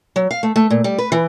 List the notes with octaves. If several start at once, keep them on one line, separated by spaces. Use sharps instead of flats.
F#3
F5
A3
A3
A#2
G3
B4
E3